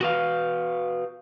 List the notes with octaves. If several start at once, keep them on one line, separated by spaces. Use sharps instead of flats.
F#4 B4 F5